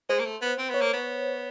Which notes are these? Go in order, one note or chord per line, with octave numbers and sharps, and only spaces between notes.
G#3 C5
A#3
A3
B3
C4
B3 C#5
A#3
B3